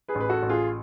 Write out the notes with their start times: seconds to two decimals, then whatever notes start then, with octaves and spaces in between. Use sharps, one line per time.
0.08 G#4 B4
0.15 A1
0.20 B4
0.29 F#4 A4
0.43 A1
0.49 F4 G#4